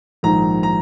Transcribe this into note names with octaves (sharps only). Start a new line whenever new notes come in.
A#1 G#2 D#3 A#5
A#5